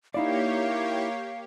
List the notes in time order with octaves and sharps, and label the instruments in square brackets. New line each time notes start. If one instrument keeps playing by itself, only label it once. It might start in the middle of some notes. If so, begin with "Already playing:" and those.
[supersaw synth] A#3 G4 C#5 [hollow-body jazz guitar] D#4 E4 D5 [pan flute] F5